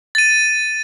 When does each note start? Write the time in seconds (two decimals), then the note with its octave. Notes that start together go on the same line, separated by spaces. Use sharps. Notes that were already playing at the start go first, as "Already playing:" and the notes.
0.15 A6 D#7